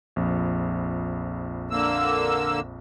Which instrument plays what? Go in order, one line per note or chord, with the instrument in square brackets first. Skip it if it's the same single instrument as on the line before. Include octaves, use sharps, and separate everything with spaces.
[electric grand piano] A#1 F2
[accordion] D3 A#3 E6